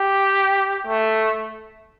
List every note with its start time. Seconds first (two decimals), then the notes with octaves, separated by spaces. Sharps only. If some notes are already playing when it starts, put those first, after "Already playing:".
Already playing: G4
0.87 A3